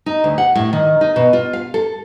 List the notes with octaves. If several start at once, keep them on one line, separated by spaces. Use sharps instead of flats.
D#4
D2
F#5
A2
D#3
D#4
B2
F4
F5
A4